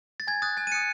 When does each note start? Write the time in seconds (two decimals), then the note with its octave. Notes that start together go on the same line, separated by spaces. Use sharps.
0.20 A6
0.27 G#5 G#6
0.42 D#6 F#6 A6
0.57 G#5 A6
0.67 D#7
0.72 D#6 F#6 C#7